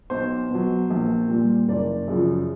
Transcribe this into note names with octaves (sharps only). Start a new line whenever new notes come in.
B1 C5
B2 F#3
A#1
A#2 G3
F#1 D5
F#2 C#3 F3